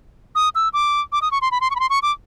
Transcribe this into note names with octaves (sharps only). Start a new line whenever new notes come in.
D#6
E6
D6
D6
D#6
C#6
C6
B5
C6
C#6
B5
C6
C#6
D6